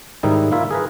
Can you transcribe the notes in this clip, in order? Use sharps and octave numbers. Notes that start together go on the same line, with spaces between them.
G#2 D#3 G3 D#4 E4
A#3 E4 F4 E5
G#4 A#4 B4